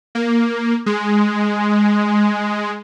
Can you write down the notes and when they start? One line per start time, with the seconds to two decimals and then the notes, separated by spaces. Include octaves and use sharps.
0.15 A#3
0.86 G#3